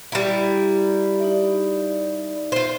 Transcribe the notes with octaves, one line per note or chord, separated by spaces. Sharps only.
G3 E4 A#5
D#4 D5 E5
F4 C5